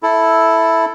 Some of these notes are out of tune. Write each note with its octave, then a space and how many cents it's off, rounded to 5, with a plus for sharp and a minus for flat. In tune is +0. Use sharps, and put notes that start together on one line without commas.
E4 +0 A4 +0